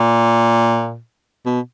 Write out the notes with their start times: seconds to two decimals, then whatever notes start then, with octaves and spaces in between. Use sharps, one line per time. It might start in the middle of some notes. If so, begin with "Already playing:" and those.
Already playing: A#2
1.46 B2